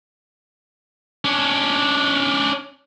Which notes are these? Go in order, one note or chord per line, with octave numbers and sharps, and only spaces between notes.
C#4 D4